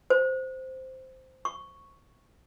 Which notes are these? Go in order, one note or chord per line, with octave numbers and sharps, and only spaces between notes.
C5
C#6